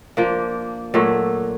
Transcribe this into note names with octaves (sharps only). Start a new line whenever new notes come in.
F3 A#3 D4
A#2 F#3 A3